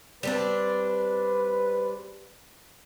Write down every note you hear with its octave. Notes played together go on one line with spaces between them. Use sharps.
G3 C4 D4 B4